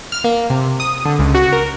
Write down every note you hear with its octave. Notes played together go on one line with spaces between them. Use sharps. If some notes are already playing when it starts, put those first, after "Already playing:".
F6
A#3
C3
D#6
D3
C#2
F#4
A#4